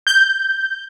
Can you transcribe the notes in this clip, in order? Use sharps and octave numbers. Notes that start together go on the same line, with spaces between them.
G6